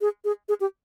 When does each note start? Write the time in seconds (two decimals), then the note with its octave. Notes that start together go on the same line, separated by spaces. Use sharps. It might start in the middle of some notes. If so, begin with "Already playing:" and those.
0.01 G#4
0.25 G#4
0.49 G#4
0.61 G4